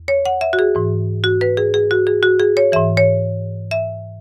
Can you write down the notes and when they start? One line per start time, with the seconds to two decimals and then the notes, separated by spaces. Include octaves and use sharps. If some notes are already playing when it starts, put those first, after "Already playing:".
Already playing: E2
0.08 C#5
0.26 F#5
0.41 E5
0.53 F#4
0.59 G#4
0.75 G#2 E3
1.24 F#4
1.41 B4
1.57 G#4
1.74 G#4
1.91 F#4
2.07 G#4
2.23 F#4
2.40 G#4
2.57 C#5
2.72 G#2 E3 E5
2.97 C#5
3.71 E5